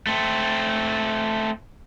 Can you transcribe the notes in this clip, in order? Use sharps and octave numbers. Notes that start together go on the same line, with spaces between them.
A3 C4